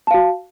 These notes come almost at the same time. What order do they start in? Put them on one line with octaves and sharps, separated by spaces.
A5 F5 F#4